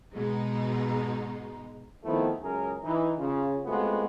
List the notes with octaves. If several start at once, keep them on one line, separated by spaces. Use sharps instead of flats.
G#2 B2 G#3 D#4
D#3 F3 A3 B3 C4 E4
C#2 F#2 G#4 A#4
E3 D#4
C#3 F4
G#3 A3 B3 C4 F4 F#4